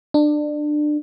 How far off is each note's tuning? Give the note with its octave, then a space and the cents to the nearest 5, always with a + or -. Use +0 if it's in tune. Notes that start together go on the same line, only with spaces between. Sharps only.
D4 +25